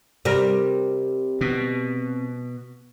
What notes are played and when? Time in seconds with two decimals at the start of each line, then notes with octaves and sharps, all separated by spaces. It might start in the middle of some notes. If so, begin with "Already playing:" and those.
0.25 C3 G3 A#4
1.41 B2